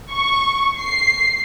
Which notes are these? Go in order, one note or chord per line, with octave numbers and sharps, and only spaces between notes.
C#6
C7